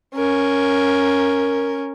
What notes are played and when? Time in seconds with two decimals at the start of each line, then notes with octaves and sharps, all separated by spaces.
0.16 C#4 A#4